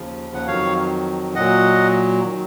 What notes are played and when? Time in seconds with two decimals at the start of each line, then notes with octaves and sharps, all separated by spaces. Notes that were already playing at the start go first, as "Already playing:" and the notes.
Already playing: D#2 C#3 F3
0.34 F#5
0.47 F2 D#3 F#3 C#5 F5
1.35 A#2 F#3 D#5 F#5
2.24 D#3 F#3